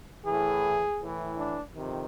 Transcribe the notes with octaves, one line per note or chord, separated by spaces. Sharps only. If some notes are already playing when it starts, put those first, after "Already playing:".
A2 E3 G#4
A2 E3
D4
F2 C3 D#3